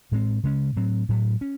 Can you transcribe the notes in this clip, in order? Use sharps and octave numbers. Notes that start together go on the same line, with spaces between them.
A2 G#3 C4
C#3 G#3 C#4
A2 F#3 C4
A2 F#3 A3
C#4